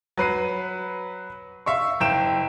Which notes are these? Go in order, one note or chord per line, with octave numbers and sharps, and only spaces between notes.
F#3 B4 C7 D#7
E5 F5 C#6
F#1 G5 E7